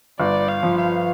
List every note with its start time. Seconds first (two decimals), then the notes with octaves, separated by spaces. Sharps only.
0.20 G1 D5
0.48 F5
0.63 F3
0.78 F5